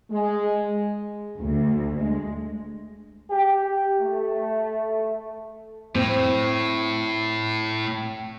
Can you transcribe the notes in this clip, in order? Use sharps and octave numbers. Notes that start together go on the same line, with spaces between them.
G#3
D2
G#3
G4
A3
A2 C4